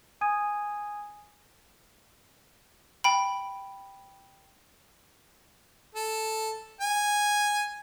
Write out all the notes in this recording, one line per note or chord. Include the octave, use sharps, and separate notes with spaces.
G#5 D#6 G#6 D#7
G5 B5
A4
G#5